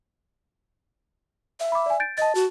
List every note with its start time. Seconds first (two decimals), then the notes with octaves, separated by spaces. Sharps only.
1.60 E5
1.72 B5 D6
1.86 D5 G#5
2.00 G6 A6 D7
2.18 D#5 A5 A6
2.35 F#4